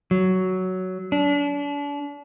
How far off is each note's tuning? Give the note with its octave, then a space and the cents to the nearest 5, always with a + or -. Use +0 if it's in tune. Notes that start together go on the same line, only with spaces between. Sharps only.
F#3 +10
D4 -35